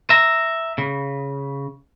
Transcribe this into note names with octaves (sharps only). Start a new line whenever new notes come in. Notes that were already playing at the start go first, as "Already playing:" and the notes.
E5 A#5
C#3